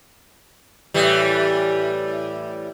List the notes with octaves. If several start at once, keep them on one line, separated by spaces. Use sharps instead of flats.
A2 E3 G3